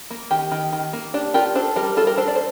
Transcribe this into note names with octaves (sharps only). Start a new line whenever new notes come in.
A#3
D#3 G4
D#3
D#3
A#3
D4 G4
F4 G4 A#4
D4 A4 C5
G3 G4 A#4
G3 F4 A4
G4 A#4
D4 A4 C5
D5
C5